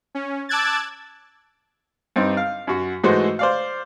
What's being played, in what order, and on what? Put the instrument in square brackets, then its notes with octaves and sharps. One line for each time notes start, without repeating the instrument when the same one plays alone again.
[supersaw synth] C#4
A5 D6 E6 F#6 G#6 A6
[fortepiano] G2 C4 D#4
F5
F#2 F#4
G#2 E3 G#3 A3 F#4 C5
C5 D5 F5